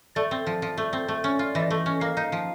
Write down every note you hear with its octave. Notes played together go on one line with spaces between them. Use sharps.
A3 D5
C4
F3
F3
A3
C4
A3
C#4
F4
E3 D#5
A3
C#4
A#3 F5
D#4
F3